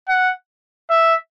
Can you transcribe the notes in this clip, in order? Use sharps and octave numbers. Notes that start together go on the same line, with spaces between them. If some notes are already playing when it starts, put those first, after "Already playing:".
F#5
E5